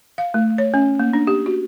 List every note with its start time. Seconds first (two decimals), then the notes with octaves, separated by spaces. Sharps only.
0.18 F5
0.34 A3
0.58 C#5
0.74 C#4
1.00 A#3
1.13 D4
1.27 G4
1.46 F#4